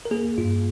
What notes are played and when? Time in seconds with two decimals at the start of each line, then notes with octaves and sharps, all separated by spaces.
0.05 A#4
0.11 A#3 G#4
0.38 G2 F4